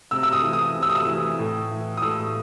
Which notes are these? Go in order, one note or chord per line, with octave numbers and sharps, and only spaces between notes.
C3 E6
E6
D#6
E3
D#6
C3
E6
D#6
E6
E3
A2
E3
D#6
A2 E6